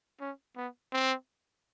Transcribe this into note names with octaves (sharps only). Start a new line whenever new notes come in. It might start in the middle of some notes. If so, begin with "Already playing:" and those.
C#4
B3
C4